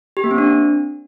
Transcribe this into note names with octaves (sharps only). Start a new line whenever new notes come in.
G4
A#3
C4
D4